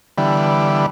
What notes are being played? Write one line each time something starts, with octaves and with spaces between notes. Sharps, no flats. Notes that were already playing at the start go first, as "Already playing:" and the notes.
D3 E3 G3 B3